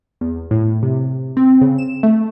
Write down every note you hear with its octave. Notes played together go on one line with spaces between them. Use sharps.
E2
A2
C3
C4
C#3
E7
A3